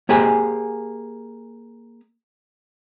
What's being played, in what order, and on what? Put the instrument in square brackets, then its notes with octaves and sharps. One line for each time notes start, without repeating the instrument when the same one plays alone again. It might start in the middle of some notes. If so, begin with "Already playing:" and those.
[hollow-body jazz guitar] A#3 G4 G#4 C5 G#5